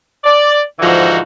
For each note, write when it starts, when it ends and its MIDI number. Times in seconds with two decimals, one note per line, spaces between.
0.24 0.61 74
0.79 1.19 44
0.79 1.19 50
0.79 1.19 52
0.79 1.19 53
0.79 1.19 63
0.79 1.19 66